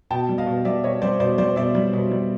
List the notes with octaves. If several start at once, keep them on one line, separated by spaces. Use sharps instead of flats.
B2 G5 A5
G3
D#5 F5
B2
G3 D5 E5
B2 C#5 D#5
G3 C5 D5
B2 C5 D5
G3 C5 D5
B2 D5 E5
G3
B2
G3